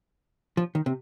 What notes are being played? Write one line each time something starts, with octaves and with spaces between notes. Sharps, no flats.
F3
D#3
C3